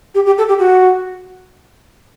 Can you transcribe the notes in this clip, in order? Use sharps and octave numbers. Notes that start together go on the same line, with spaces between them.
G4
G4
A4
G4
F#4